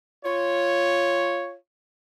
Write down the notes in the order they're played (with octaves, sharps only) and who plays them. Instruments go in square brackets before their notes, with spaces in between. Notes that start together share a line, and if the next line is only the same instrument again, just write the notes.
[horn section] F4 C#5